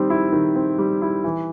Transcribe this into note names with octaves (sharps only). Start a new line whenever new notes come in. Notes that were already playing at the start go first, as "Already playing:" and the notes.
Already playing: D#3 G3 C4
E4
D#3
C4
G3
E4
E3